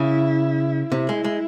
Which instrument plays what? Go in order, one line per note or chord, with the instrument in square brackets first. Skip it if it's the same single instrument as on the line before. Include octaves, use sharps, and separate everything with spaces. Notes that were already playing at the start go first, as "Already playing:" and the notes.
Already playing: [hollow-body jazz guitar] C#3 [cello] E4
[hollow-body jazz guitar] C3 [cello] E4
[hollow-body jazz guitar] G#3
G#3